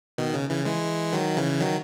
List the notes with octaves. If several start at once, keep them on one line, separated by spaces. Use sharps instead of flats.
B2 D#3
C#3
C#3 E3
E3 G#3
D#3 F#3
C#3 E3
D#3 F#3